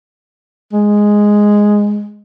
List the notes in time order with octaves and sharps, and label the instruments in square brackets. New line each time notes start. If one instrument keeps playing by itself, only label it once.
[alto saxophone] G#3